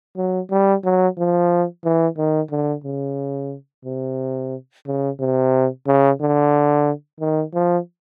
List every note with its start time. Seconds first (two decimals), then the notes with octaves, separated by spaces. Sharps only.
0.17 F#3
0.51 G3
0.84 F#3
1.18 F3
1.84 E3
2.18 D#3
2.51 D3
2.85 C#3
3.85 C3
4.86 C#3
5.20 C3
5.87 C#3
6.21 D3
7.20 D#3
7.54 F3